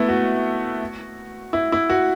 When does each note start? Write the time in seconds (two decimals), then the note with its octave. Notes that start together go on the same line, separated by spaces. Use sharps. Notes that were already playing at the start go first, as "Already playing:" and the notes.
Already playing: A3 B3 E4
0.09 F#4
1.53 E4
1.72 E4
1.90 F#4